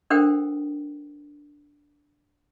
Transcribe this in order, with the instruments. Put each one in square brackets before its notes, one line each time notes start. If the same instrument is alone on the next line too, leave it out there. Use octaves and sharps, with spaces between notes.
[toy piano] D4 A4 A#4 C5 F#5 G5